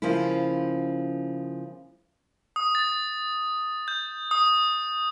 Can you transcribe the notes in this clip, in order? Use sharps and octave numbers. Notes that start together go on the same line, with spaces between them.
C#3 F3 A#3 C#4 E4
D#6
A6
G6
D#6